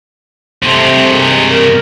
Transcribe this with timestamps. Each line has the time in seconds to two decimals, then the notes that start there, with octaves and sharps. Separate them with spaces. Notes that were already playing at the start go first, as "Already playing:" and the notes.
0.63 G2 C3 A3 C4
1.07 D#2 D#3 G#3
1.50 A#4